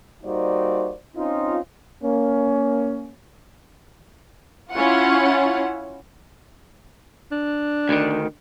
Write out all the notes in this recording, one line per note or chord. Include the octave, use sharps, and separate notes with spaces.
G3 A#3 D#4 F#4 C5 D5
C4 C#4 D#4 F4
A#3 C#4
C#4 E4 F4 F#5
D4
D2 D#3